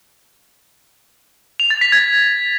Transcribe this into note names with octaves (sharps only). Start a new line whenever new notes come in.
F7
A6
B6
G#6